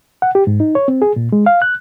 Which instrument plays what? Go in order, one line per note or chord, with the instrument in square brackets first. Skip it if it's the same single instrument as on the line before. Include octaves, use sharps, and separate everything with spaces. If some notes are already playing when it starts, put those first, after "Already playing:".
[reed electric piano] F#5
G4
G#2
D#4
C#5
C4
G#4
A#2
G#3
F5
F#6